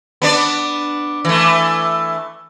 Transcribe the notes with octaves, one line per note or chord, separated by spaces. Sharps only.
B3 D4 D5
E3 A3